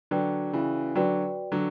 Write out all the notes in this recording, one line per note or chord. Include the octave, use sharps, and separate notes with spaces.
D3 F#3 F#4 B4 D5 G5
C#3 E3
D3 F#3 F#4 B4 D5 G5
D3 F#3